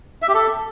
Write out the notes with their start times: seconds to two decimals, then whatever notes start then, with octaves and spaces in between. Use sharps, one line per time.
0.22 E5
0.28 G4
0.34 A4